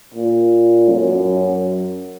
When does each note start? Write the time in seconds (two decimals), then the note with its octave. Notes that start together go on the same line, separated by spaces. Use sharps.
0.14 A#2
0.89 F#2